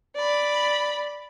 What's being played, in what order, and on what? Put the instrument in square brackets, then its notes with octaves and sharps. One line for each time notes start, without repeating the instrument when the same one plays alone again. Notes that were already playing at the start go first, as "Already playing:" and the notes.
[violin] D5 B5